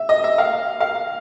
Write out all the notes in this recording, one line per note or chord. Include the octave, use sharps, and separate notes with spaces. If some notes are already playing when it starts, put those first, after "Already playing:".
Already playing: E5
D#5
E5
F5
F5